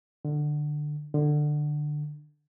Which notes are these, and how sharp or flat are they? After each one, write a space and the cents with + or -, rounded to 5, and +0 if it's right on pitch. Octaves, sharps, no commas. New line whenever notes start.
D3 +20
D3 +20